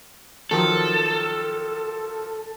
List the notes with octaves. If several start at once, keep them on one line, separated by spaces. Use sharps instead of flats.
D#3 F3 F#3 A4